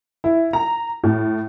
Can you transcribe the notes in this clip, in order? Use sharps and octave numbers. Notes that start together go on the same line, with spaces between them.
E4
A#5
A2